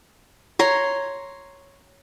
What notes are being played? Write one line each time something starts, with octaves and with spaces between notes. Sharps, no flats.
C#5 A#5 C6